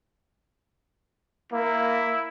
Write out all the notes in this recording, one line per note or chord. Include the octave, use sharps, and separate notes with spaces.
A#3 E4